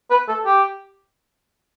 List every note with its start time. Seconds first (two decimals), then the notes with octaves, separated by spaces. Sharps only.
0.11 B4
0.28 A4
0.46 G4